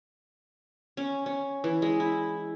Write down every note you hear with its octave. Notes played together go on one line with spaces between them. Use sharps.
C#4
C#4
E3
G#3
E4